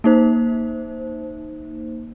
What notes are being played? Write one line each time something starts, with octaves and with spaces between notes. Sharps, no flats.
A#3 D#4 C5